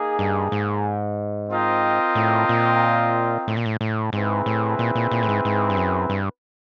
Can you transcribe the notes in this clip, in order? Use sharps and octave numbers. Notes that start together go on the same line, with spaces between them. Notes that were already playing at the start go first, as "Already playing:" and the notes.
Already playing: A#3 D#4 G#4
G2
G#2
C4 F4 A#4 D#5 G5
A2
A#2
A2
A#2
A2
A2
G#2 C4 E4 G#4 B4
A2
A#2
A#2
A#2
A2
G#2
G#2
G2
F#2
G2